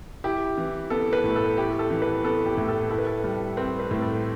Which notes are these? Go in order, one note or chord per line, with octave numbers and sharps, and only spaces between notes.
E4 G4
E3
B3 A4
B4
A2
A4
E4 G4
A4
E3
B4
B3 A4
G4
A2
A4
E4 A4
B4
A4
G3
C4 B4
B4
A2
A4